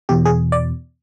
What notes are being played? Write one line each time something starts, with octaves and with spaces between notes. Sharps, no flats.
E2 B2 G4
G#4
D5